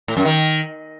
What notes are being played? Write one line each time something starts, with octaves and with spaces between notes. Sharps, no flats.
A2
F#2
D#3